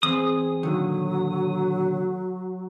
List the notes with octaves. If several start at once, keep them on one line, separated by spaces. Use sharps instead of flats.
E2 C4 G#4 D#6
A#2 D3 D#3 F#3